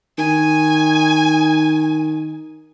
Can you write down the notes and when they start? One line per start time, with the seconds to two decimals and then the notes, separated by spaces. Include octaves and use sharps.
0.18 D#3 G#5